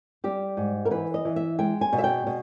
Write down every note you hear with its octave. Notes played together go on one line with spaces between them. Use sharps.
G3 G4
G#2
A#4
E3 B4
D#5
E3
E5
G#3 G5
G#5
B2
E5
G5
B2